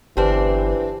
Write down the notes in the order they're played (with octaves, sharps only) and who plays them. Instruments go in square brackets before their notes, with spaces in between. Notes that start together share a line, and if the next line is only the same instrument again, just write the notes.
[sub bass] G1 [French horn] E3 [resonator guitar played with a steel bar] C4 D4 [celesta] G4 B4 C5